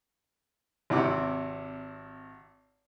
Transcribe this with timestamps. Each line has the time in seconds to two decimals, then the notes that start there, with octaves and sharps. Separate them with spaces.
0.90 G#1 C3 E4 F#5 D6